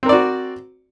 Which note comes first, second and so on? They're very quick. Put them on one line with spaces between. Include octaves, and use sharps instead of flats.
C4 A#4 D5 F#4